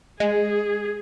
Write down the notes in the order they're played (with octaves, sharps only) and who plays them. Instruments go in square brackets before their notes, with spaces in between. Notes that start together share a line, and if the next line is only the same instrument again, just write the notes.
[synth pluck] G#3 [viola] G#4